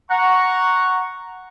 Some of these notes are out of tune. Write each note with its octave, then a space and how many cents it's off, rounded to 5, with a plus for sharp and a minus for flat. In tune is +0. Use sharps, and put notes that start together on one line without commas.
F#5 +0 A#5 +0 C#6 +0